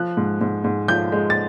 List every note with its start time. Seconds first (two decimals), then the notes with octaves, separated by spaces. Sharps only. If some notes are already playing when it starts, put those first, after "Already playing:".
Already playing: F3 F#6
0.17 G#2
0.41 G#2
0.64 G#2
0.88 F3 G6
1.12 G#3
1.30 A6